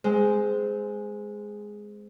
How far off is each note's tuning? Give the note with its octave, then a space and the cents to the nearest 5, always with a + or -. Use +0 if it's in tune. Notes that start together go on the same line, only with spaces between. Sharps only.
G#3 +0 C4 -20